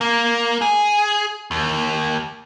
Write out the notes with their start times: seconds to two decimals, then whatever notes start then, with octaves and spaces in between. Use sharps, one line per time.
0.01 A#3
0.61 G#4
1.51 D#2